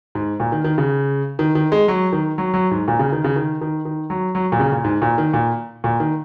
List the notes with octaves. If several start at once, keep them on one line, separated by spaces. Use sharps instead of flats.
G#2
A#2
D#3
D#3
C#3
D#3
D#3
G#3
F#3
D#3
F#3
F#3
G#2
A#2
C#3
D#3
C#3
D#3
D#3
D#3
F#3
F#3
A#2
C#3
A#2
G#2
A#2
D#3
A#2
A#2
D#3